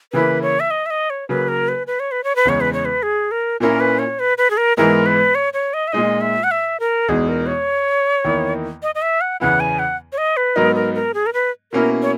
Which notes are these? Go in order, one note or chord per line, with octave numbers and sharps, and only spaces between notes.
C#3 E3 A#3 E4 B4
C#5
E5
D#5
E5
D#5
C#5
C#3 F#3 A#3 B4
A#4
B4
B4
C#5
B4
C#5
B4
E2 C#3 G#3 C#5
B4
C#5
B4
G#4
A#4
A#2 A#3 C#4 E4 A#4
B4
C#5
B4
B4
G#4
A#4
G#2 E3 G#3 B3 E4 A#4
B4
C#5
C#5
D#5
E5
A#2 G#3 D#4 D#5
E5
F#5
E5
A#4
E2 B2 G#3 D#4 G#4
A#4
C#5
E2 D#3 A#3 E4
D#5
D#5
E5
F#5
E2 C#3 E3 B3 E4 F#5
G#5
F#5
C#5
D#5
B4
G#2 F#3 B3 D#4 A#4
A#4
A#4
G#4
A#4
B4
B2 A#3 C#4 E4 A#4
C#5